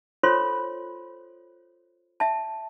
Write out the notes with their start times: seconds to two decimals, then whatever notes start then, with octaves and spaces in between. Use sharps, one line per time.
0.23 F4 A4 C5 C#5 B5 C6
2.20 E5 A5